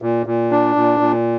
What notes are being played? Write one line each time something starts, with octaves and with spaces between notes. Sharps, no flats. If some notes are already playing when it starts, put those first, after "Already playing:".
A#2
A#2
D4
A#2
A#2